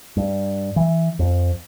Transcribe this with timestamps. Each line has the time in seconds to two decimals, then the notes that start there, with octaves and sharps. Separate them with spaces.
0.17 G2
0.76 E3
1.19 F2